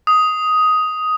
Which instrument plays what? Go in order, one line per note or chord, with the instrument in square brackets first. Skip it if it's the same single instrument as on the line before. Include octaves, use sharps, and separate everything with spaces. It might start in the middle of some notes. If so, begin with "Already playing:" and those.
[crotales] D#6